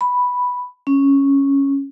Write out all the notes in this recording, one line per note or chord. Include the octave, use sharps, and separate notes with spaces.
B5
C#4